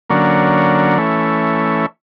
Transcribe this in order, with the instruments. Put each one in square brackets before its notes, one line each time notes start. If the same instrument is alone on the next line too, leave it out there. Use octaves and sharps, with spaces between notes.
[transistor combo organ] D3 F#3 A#3 C#4
E3 A3 C#4